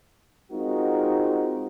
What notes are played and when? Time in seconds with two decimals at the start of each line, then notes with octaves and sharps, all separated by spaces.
0.51 G#3 C4 D#4 F4 F#4 A#4